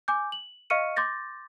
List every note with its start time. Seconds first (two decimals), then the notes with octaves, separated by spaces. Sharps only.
0.08 G#5 D6 G6
0.32 F#7
0.70 D#5 F5 C#6 F6 C#7 D#7
0.96 C6 D6 G6 A6 A#6